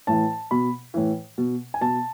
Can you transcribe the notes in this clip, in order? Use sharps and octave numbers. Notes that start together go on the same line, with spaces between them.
A2 E3 A5
B2 B5
A2 E3
B2
G#5
B2 A5